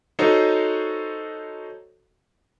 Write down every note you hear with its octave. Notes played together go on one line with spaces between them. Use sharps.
D#4 F#4 A4 C5 C#5 D#5